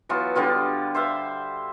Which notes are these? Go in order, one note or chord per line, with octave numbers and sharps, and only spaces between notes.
E3 F#3 B3 F4
D3 G3 B3 F4
C5 E5 F5